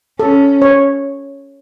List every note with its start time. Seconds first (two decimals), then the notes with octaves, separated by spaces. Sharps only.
0.20 C#4 A4
0.62 C#5